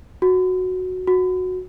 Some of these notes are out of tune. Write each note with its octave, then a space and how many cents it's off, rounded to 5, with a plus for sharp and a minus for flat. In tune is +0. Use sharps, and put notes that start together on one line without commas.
F#4 -5
F#4 -10